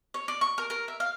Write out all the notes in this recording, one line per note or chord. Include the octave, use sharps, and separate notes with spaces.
C#5
D5
C#6
A#4
A#4
E5
F5